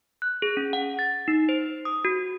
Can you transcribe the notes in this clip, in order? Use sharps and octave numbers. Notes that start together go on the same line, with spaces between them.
F#6
G#4
C#4
F#5
A6
D#4
C5
D#6
F#4